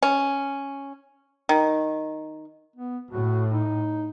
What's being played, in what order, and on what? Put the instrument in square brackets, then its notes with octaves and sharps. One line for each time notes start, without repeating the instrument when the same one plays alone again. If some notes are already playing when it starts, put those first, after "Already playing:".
[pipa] C#4
D#3
[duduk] B3
[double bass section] A2 [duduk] F#4
[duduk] D#4